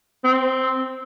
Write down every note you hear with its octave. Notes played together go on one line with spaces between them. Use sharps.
C4